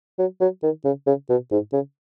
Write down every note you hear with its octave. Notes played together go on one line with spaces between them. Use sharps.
F#3
F#3
D#3
C#3
C#3
B2
G#2
C#3